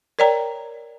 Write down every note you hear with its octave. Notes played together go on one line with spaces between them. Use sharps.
A#4 C#5 D5 G5 A#5